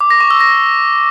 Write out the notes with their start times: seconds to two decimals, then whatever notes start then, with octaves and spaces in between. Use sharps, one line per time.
0.01 D6
0.10 A#6
0.20 C#6
0.30 E6
0.40 A#6